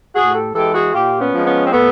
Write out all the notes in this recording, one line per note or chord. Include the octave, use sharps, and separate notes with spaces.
A2 F#4 G#4
G4 A4
E3 G#3 G4 A4
F#4 G#4
A#2 F4 G4
B3 C#4
F3 G#3
B3 C#4
C4
A#2 A3 B3